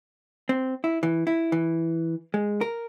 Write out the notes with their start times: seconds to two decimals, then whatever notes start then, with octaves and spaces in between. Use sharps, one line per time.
0.49 C4
0.84 E4
1.03 E3
1.27 E4
1.52 E3
2.34 G#3
2.61 A#4